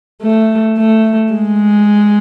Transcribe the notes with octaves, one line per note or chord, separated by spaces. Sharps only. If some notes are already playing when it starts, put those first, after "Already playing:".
A3
A3
G#3